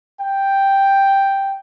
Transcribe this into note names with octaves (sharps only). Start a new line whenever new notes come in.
G5